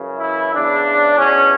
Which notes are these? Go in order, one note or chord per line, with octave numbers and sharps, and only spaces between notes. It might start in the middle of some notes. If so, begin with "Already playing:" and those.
Already playing: F#2 C#3 E3
E4
E2 C#3 E3 D4
E2 B2 C#4